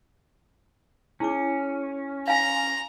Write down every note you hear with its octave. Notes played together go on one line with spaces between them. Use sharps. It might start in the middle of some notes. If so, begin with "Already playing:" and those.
C#4 E4 G#4 D6
F5 G#5 A#5